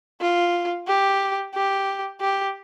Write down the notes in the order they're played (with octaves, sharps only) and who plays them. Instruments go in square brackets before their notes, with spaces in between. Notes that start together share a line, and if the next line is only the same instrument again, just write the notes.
[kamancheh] F4
G4
G4
G4